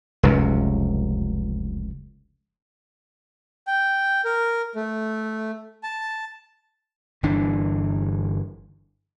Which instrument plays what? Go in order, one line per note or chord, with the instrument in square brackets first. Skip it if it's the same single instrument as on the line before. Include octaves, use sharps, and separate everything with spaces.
[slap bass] F1 C#2 F#2
[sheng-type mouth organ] G5
A#4
A3
A5
[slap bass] G1 E3 D4